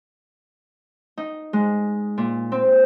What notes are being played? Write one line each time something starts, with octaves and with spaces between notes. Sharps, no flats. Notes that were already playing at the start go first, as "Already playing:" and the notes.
D#4
G#3
A#2
C4